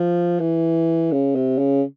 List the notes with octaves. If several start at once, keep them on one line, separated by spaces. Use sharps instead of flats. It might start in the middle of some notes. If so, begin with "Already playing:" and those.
Already playing: F3
E3
C#3
C3
C#3